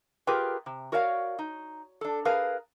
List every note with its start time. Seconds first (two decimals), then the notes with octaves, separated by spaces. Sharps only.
0.27 F4 G4 G#4 A#4 B4 G5
0.66 C3
0.92 F#4 A#4 C#5 D5 E5 F5
1.39 D#4
2.01 D4 A4
2.25 G#4 A#4 B4 F5